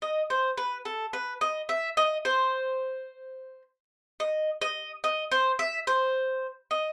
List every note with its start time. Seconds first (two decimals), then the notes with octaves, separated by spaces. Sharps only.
0.02 D#5
0.30 C5
0.57 B4
0.85 A4
1.13 B4
1.41 D#5
1.69 E5
1.97 D#5
2.25 C5
4.20 D#5
4.62 D#5
5.04 D#5
5.31 C5
5.59 E5
5.87 C5
6.71 D#5